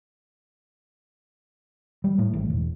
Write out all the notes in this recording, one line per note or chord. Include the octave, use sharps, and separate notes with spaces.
G3
A2
G#1
E1